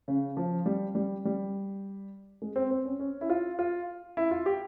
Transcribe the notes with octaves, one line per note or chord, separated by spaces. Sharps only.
C#3
F3
G3
G3
G3
G#3
C4
C4
C#4
C#4
E4
F4
F4
E4
F4
G4